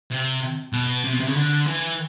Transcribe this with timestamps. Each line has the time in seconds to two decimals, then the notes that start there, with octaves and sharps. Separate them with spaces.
0.11 C3
0.73 B2
1.04 C3
1.13 B2
1.20 C3
1.27 C#3
1.35 D3
1.66 E3